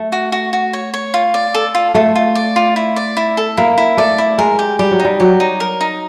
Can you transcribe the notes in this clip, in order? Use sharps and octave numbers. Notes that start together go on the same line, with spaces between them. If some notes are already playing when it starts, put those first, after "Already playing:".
Already playing: A3
F#4
F#4
F#4
C#5
C#5
F4
D5
A4
F4
A3 F4
F4
D5
F4
E4
D5
E4
A4
A#3 E4
E4
A3 D5
E4
G#3 A#4
G4
G3 G4
F#3
D#4
G3
F#3 G4
D#4
A#4
D#4